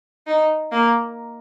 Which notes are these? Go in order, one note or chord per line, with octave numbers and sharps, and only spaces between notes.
D#4
A#3